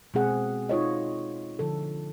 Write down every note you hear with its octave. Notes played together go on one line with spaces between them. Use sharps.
B2 G#3 C4 G#4 F#5
D#4 F4 C#5 D#5
D3 F3 A4